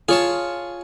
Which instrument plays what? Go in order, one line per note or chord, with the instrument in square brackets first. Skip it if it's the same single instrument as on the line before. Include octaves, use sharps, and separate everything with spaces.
[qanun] F4 [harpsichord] G#4 C#5 A5